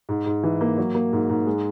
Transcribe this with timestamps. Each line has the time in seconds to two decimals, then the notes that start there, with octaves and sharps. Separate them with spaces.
0.09 G#2
0.26 G#2
0.43 E3
0.61 A#3
0.78 F#3
0.95 A#3
1.13 G#2
1.29 G#2
1.46 G#3